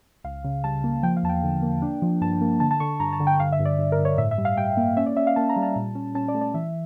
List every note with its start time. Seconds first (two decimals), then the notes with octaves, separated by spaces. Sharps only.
0.24 C#2 F5
0.44 C#3
0.64 G3 A5
0.84 A#3
1.03 F3 G5
1.17 F5
1.23 E2 A5
1.29 G5
1.43 D3
1.62 A#3
1.82 D4
2.02 F3
2.21 G2 A5
2.41 A#3
2.60 D3 A5
2.71 A5
2.80 D3 C#6
3.00 G2 A#5
3.13 A5
3.20 D3
3.27 G5
3.39 G2 F5
3.52 E5
3.60 G2
3.65 D5
3.79 G2
3.92 A#4
3.99 G2
4.05 C#5
4.18 A2 E5
4.31 E5
4.38 G3
4.45 F5
4.57 G3 G5
4.77 A#3
4.97 C#4 E5
5.06 D5
5.16 C#4 E5
5.27 F5
5.36 A#3 A5
5.49 A#5
5.56 G3
5.63 A5
5.76 A#2
5.95 C#4
6.15 C#4 A5
6.28 D5
6.35 A3
6.41 D5
6.54 E3 E5